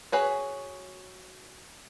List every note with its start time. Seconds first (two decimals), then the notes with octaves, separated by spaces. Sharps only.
0.12 F#4 G#4 B4 C#5